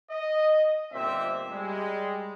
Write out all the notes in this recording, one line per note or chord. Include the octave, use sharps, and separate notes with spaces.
D#5
G1 A#2 C4 G4 E5
G3 G#3